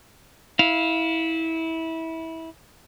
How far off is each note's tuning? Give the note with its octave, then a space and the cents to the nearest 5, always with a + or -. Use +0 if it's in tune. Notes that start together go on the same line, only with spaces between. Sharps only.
E4 -20 F5 +0